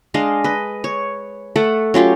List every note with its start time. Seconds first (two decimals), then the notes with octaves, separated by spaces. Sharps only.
0.14 G#3 D4 D#5 F5
0.44 B4 D#5
0.84 C#5
1.56 A3 A4 F#5
1.94 F#3 C#4 F4 G4